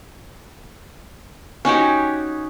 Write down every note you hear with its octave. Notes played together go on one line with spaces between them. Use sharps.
C#4 D#4 F#4 G4